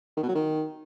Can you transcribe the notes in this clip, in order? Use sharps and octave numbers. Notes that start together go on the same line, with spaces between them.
D#3
B2
F#3
D#3